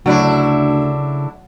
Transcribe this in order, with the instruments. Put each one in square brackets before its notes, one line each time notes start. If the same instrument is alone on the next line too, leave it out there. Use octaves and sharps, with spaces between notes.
[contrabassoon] D2 [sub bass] C#3 [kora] F#3 D5 [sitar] A3 D4 E4